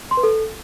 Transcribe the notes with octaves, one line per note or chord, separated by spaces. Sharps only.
C6
B4
A4